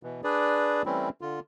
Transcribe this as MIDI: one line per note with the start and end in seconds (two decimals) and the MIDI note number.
0.03 0.21 47
0.03 0.21 52
0.24 0.82 62
0.24 0.82 68
0.24 0.82 71
0.24 0.82 74
0.86 1.09 52
0.86 1.09 55
0.86 1.09 57
0.86 1.09 60
0.86 1.09 61
0.86 1.09 64
1.21 1.40 50
1.21 1.40 65